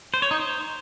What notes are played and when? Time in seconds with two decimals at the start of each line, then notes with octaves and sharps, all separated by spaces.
0.14 C5
0.22 C#5
0.31 D#4
0.40 C5